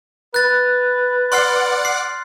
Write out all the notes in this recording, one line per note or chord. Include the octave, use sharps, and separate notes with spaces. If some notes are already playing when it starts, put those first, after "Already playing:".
B4 F#6 A6
D5 F#5 C6 F6 C7
C7